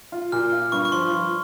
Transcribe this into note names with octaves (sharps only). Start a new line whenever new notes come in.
F4
A#2 F6
F4
G2 C#6
C#6
F3 C6
F3